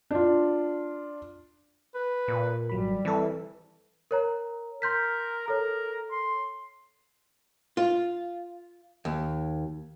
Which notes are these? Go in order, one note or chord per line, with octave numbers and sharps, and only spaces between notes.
D4 F4
B4
A#2
G#1 F#3 G3 B5
E3 C4 A4
A#4 C#5 A#5
A#4 C6 G6 B6
A4 A#4 C#5
C6
F4
D#2